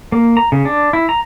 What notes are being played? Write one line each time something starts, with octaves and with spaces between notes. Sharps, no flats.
A#3
A#5
C#3
D4
E4
A#5